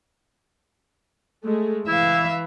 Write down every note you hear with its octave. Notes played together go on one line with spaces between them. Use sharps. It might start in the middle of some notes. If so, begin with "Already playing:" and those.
G#3 A3
E3 E4 E5 F5